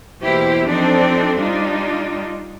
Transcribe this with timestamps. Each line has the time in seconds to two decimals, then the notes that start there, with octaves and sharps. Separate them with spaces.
0.22 E2 B2 A#3 E4 G4 C5
0.66 F3 C4 D4 D#4 A4
1.36 G3 D4 D#4 F4